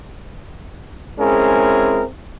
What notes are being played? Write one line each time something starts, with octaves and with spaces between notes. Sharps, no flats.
G#3 C4 C#4 E4 G#4 A#4